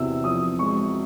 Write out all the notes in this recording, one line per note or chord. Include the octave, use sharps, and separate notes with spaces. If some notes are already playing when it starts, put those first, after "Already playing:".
Already playing: E2 C3 E6
F3 D#6
G#3 C#6